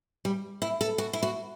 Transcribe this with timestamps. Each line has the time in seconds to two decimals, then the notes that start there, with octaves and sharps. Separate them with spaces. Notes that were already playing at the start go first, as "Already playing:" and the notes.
0.25 G3
0.62 E4
0.81 A4
0.98 F#4
1.13 E4
1.23 F#4